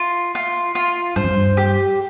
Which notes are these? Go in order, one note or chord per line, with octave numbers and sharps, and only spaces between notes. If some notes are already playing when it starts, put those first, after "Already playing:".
Already playing: F4
F4
F4
G2 C5
F2
G2
G4